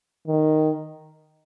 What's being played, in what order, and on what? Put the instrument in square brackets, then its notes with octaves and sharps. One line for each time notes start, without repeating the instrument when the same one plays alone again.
[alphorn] D#3